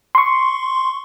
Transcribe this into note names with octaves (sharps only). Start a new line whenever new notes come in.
C6 C#6